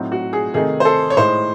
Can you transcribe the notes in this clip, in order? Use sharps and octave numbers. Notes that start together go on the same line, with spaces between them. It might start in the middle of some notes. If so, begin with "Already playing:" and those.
Already playing: A2 F#3 C4 D#4
F#4
G#4
C3 D#3 A3 D#4 G#4
C5
A4
C#5
A2 G#3 D#4 C5